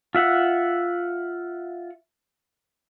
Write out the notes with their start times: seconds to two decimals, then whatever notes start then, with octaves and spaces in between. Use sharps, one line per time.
0.15 F4 E5 F#5